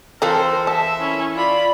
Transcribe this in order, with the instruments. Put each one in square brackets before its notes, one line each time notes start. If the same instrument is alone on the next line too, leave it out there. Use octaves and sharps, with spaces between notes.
[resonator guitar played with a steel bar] E3 A4 [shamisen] C4 F4 [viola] A#4 C5
[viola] E5 [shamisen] A5
[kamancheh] C#4 E4
[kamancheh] F4 B5 [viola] D5